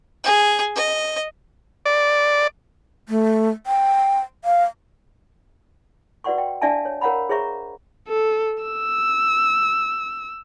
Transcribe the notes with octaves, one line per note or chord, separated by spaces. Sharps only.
G#4
D#5
D5
A3
G5
F5
F#4 B4 D5 F#5 C6 C#6
G5
D4 D5 E5 F5 G#5 A5
C#5
A#4 C#5 F5 F#5 A#5 B5
G#4 C5 C#5 E5 A#5 C#6
A4
E6